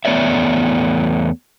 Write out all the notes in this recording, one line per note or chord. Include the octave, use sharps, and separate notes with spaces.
E2 A3 B3 C#5 D5 E5